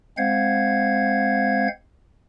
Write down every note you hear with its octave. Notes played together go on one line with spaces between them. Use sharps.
G#3 C4 C5 F5 F#5 G#6